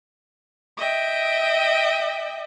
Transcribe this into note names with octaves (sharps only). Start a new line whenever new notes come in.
D#5 E5 G5